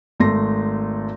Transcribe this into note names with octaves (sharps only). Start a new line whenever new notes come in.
G#1 A3 C6 A#6